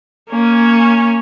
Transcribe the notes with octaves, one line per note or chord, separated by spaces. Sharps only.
A#3 C#4